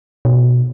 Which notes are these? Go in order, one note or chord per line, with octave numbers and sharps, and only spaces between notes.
B2